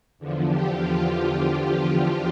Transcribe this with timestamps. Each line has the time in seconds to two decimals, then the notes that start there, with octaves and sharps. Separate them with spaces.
0.19 E2 D3 F3
0.47 G4
0.76 F4